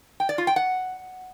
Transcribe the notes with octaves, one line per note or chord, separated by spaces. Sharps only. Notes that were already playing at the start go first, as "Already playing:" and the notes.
G5
D5
F4
G5
F#5